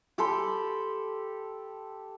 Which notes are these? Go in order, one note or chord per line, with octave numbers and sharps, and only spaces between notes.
G4 A4 B5 C6